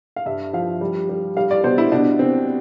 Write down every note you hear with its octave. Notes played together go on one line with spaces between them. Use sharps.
F5
G2 E5
F3 F5
G3
G3
G3 F5
D5
B2 C5
E4
B2 D4
B2 C4